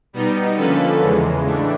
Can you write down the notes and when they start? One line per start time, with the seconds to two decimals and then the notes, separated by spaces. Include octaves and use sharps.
0.13 B2 G3 B3 D#4
0.57 D3 F3 A#3 C#4 A4 B4
1.02 E2 C#3 E3 G#3
1.46 A2 E3 A3 D4